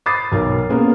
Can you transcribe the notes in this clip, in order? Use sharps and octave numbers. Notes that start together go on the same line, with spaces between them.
B5 D6 D#6 A6 C7
B1 A#4
G#3 A#3 B3 C#4